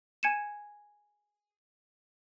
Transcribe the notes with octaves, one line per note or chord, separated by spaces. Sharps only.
G#5 G#6 C#7 D#7 E7